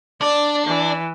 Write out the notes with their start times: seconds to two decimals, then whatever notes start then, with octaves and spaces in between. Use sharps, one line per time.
0.21 D4 D5
0.67 E3